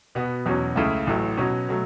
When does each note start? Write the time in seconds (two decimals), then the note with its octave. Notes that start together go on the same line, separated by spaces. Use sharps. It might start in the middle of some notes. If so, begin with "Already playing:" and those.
0.15 B2 B3 F#4
0.46 E2 B2 F#3 C#4
0.76 C#2 C#3 A3 E4
1.07 A1 A2 F#3 A3
1.37 B2 F#3 C#4
1.69 B2 F#3 A3